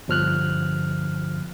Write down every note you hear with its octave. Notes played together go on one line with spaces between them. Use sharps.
G1 F3 F6 F#6